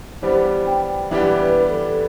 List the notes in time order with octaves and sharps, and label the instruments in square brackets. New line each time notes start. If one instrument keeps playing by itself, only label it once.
[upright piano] E3 G3 B3 D4 G4 [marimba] C5
[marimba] G5
[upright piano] E3 G3 B3 D4 G4 [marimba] E5
[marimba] B4
A4